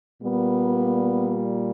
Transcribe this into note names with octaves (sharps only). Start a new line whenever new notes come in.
A#2 G3 A#3 B3